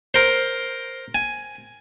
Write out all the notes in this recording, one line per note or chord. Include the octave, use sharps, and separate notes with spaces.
A#4 C5
G#5